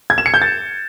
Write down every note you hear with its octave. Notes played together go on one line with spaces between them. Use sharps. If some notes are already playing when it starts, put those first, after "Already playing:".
G#6
E7
C#7
G6
A6